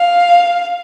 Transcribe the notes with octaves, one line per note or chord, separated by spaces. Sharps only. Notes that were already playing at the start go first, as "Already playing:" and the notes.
Already playing: F5